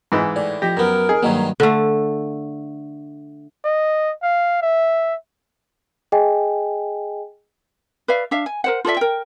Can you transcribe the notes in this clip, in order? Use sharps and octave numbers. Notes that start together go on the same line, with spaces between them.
G#2 E3
A2 D5
F3 G4 G5 A#6
F#2 B3 A#4 A#5
G#4
G2 D#3 F#3 A#3 D#5 B5
D3 A3
D#5
F5
E5
G#4 D#5 G5 G#5
B4 D5 E5 F5
D4 E5 F5
G#5
A#4 C5 F#5
F4 A4 D5 E5
A#4 G5